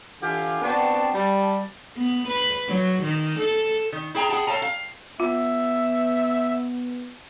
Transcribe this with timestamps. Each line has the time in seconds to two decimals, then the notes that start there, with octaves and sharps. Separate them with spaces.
0.22 D3 E3 F4 G4 F5 G#5
0.62 B3 C4 D4 F#4 G5 A5
1.15 G3 A5
1.97 B3
2.28 B4
2.68 F#3
3.02 D#3
3.39 A4
3.92 D#3
4.15 E4 G#4 G5 A5 A#5
4.29 G#4 F#5 G5 A5
4.47 A4 C#5 D#5 F5 A5 A#5
4.62 F5
5.20 B3 F4 E5